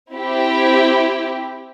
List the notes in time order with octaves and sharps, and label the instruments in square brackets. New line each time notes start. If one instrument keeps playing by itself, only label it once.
[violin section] C4 E4 G4